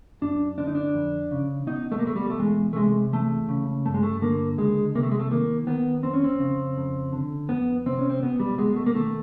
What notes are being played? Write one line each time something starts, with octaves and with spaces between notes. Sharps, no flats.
F#2 D4
D3 D4
D#4
D4
F2
C#3
B2 D#4
A3
A#3
B2 A3
G3
A3
E2 G#3
A3
C3 G#3
E2 A3
C#3
G2 A3
G#3
A3
D3 A#3
C#2 G#3
C3 A#3
A3
G#3
A3
D#3 A#3
D#3 B3
F2 C4
C#4
C4
C#3
F2
D3
F2 B3
C3 C4
C#4
C4
B2 B3
G3
B2 G#3
A3
A#3
D#3 A3